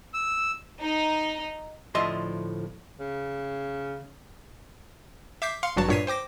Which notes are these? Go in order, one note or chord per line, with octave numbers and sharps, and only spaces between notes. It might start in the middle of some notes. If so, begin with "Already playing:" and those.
E6
D#4
D2 A2 F3 D#5 E5 C6
C#3
E5 D6 G6 B6 C7
F5 C6 C#7
G#1 G2 F#3 F#4 C#5 A5
G2 A#2 C#5 B6 C7 D#7
C5 G5 D6 A#6